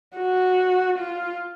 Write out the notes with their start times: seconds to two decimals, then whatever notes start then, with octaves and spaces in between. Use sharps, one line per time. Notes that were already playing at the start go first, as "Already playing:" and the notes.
0.16 F#4
0.98 F4